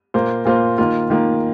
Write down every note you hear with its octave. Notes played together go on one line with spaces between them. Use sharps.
A#2 A#3 F4 C5
A#2 A#3 F4 C5
D#3 A#3 F4
D#3 A#3 F4